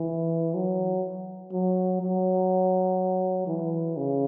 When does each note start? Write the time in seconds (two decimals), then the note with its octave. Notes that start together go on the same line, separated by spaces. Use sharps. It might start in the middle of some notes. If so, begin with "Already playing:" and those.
Already playing: E3
0.55 F#3
1.52 F#3
2.01 F#3
3.47 E3
3.97 C#3